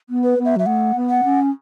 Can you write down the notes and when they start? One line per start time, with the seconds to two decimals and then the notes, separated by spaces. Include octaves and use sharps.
0.10 B3
0.24 B4
0.39 B3
0.45 E5
0.56 F#3 E5
0.66 A3 F#5
0.96 B3
1.10 F#5
1.24 C#4